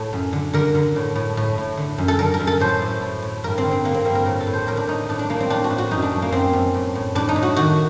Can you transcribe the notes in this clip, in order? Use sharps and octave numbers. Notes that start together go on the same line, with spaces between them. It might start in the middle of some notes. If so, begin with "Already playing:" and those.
Already playing: A2 A4
F#2
D3
D3 A#4
D3
A2
A2
A2
A2
D3
F#2
A4
D3 A#4
A#4
F#2
A4
A2 C5
A2
A2
A2
G2 A#4
C4
D3
C4
D3 A#3
C4
G2 A#4
A#4
A2 A#4
A4
A2
C5
A2 A#4
D4
A2 D#4
A2 D4
D4
A2 A#3
C4
A2 D4
F#4
A2
F#4
F#2 D#4
D4
F#2
A#3
F#2 C4
F#2
A2
A2
A2 D4
D#4
A2
F#4
D#3 F#4